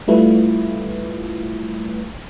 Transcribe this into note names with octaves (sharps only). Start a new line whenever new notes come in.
G3 A3 E4 F4 B4